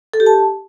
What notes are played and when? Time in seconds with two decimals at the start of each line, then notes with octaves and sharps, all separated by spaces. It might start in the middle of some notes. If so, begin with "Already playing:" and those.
0.14 A4
0.20 G4
0.26 A5